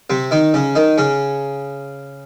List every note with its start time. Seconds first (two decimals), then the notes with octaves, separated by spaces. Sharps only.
0.10 C3 C4
0.31 D#3 D#4
0.54 C#3 C#4
0.75 D#3 D#4
0.98 C#3 C#4